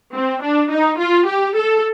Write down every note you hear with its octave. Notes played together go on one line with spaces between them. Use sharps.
C4
D4
D#4
F4
G4
A4